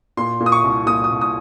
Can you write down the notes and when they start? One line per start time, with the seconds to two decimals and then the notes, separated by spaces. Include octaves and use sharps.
0.17 A#2 C6
0.40 A#2
0.46 D#6
0.52 C#6
0.64 C2
0.86 A#2 D#6
1.04 D#6
1.10 C2
1.21 D#6